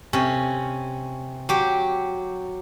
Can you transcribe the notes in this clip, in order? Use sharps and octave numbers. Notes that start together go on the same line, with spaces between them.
C3 C#4
F#3 G4